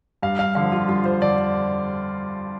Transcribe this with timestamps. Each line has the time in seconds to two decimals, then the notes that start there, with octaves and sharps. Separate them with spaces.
0.22 G2 F5
0.39 F5
0.55 D3 F3 F5
0.72 F4
0.88 G2 F4
1.05 C5
1.22 D3 D5